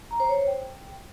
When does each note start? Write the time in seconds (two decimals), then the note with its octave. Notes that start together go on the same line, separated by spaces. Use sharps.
0.11 A#5
0.20 C5
0.29 C#5
0.38 C5
0.47 G5